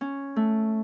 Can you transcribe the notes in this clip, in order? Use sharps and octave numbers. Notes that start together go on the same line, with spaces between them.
C#4
A3